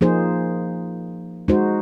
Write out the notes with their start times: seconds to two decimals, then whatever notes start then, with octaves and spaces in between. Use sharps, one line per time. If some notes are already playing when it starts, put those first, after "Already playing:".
0.01 F3 A#3 D#4 G#4 C5
1.48 G#3 D#4 F#4 C5